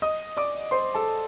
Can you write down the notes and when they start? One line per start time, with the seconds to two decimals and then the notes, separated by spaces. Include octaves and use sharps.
0.02 D#5 D#6
0.37 D5 D6
0.71 C5 C6
0.94 A4 A5